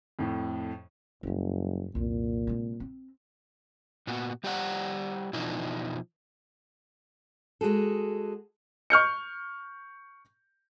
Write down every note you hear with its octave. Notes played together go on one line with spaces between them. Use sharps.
F2 A2
F#1 F#2 G3
C2 F2 A#2
C3 G#3
C4
A#2 B3 F#4
G3 G4 C5 D5 F#5
B2 E3 F3 D4 D#4
G#3 F#4 G#4 A4
C#6 F6 G6 C#7